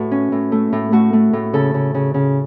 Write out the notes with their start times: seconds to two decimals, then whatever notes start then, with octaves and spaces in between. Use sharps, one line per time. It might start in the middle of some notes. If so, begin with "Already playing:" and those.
Already playing: A2 F#4 B4
0.11 C#4
0.32 A2
0.52 A3
0.73 A2
0.92 A3 F#4
1.13 A3
1.33 A2
1.53 C#3 A4
1.74 C#3
1.94 C#3
2.14 C#3